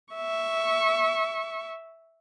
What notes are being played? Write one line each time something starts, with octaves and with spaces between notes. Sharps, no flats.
E5 C#6